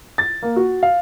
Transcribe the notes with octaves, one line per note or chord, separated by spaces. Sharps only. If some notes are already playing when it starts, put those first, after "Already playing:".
A6
A#3
F#4
F5